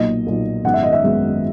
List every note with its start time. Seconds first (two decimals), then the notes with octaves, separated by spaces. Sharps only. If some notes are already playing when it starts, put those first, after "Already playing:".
Already playing: B1 A#2 A#3 D#5
0.27 B1 A#2 A#3
0.64 G#1 F#2 D#3 G#3 B3 F#5
0.74 E5
0.83 D#5
0.93 E5
1.03 G#1 F#2 D#3 G#3 B3